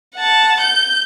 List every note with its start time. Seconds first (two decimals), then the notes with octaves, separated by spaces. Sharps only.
0.16 F#5 A5
0.61 G6